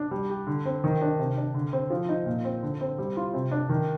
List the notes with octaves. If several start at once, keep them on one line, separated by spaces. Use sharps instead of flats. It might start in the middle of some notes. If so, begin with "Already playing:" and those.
Already playing: D4
G3
G4
D3
C4
D#3
D4
C3
D4
D3
C4
F3
D#4
A#2
C4
D3
C4
G3
F4
C3
D4
D#3